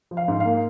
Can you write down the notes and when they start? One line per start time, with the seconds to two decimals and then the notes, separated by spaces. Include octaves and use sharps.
0.11 F3
0.17 F5
0.28 G#2
0.40 F5
0.45 A#3